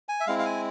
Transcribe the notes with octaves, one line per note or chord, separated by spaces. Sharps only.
G#5
E5
G#3 C4 E4 F5
F5
G#5